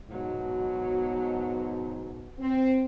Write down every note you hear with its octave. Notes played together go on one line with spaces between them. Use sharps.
G#2 B2 F#3
C4